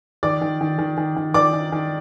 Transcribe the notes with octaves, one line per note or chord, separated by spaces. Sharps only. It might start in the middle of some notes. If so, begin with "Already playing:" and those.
D#3 D5 D6
D#3
D#3
D#3
D#3
D#3
D#3 D5 D6
D#3
D#3